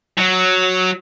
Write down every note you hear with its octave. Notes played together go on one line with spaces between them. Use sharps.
F#3